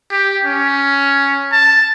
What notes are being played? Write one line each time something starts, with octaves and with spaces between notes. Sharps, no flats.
G4
C#4
A5